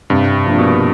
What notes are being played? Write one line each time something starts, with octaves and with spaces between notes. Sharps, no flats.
G2 C3
F3 A#3 D4
B2